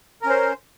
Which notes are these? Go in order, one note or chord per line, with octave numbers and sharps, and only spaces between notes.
C#4 A#4 C5